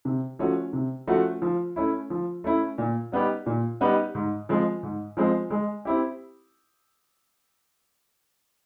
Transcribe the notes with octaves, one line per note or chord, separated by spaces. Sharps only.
C3
F3 A3 C#4 F#4
C3
F3 A3 C#4 F#4
F3
A3 C#4 E4
F3
A3 C#4 E4
A#2
G3 B3 D#4 G4
A#2
G3 B3 D#4 G4
G#2
F3 G#3 C4
G#2
F3 G#3 C4
G#3
C4 E4 G4